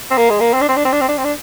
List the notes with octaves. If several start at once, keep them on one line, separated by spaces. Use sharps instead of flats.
C4
A#3
G#3
A#3
C4
D4
C4
D4
C4
D4
C4
D4
C4
D4